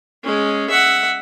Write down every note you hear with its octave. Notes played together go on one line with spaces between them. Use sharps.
G#3 C#4
E5 F#5